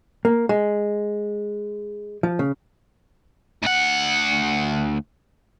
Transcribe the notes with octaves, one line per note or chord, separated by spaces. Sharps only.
A#3
G#3
F3
C#3
D2 F#5